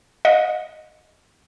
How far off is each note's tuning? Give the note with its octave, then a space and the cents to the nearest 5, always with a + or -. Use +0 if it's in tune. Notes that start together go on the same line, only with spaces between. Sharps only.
D#5 -5 F#5 -40